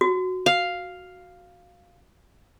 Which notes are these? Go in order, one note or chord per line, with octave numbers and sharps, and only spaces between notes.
F#4
F5